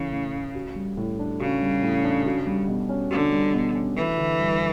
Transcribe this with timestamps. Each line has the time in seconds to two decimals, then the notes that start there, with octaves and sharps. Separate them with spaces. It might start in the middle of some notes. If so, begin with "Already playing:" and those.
Already playing: A2 C#3 E3 A3 C#4
0.12 A2
0.33 A3
0.55 F#4
0.76 G3
0.97 A2
1.19 D4
1.40 C#3 F#4
1.62 G3
1.83 A2
2.04 D4
2.26 F#4
2.47 G3
2.68 B2
2.89 C#4
3.10 D3 F#4
3.32 G3
3.53 B2
3.75 C#4
3.96 E3 A3
4.17 D3
4.39 G2